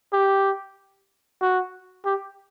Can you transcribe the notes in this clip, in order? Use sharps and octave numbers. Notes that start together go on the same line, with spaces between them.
G4
F#4
G4